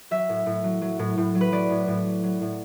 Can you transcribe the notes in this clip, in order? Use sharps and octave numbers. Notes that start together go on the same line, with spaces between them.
F#3 E5
A2
A2
F#3
F#3
A2
A2
F#3
B4
F#3 D5
A2
A2
F#3
F#3
A2